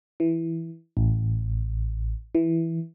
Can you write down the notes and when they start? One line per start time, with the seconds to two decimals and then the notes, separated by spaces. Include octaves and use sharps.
0.20 E3
0.97 A1
2.35 E3